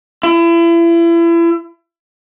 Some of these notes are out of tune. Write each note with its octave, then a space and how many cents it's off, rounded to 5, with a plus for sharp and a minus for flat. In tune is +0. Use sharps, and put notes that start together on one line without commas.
E4 +35